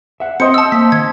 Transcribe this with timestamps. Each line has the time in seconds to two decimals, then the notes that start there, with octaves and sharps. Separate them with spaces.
0.20 E5 F#5
0.40 C4 C5 D#5 C#7
0.54 A5 E6
0.72 A#3 B6
0.92 D#3 G#6